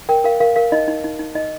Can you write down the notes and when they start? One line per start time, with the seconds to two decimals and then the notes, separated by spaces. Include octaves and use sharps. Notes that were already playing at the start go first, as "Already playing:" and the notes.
0.09 A#4 G5
0.24 A#4 F5
0.40 A#4 F5
0.56 A#4 F5
0.72 D#4 D#5
0.88 D#4
1.04 D#4
1.19 D#4
1.35 D#4 D#5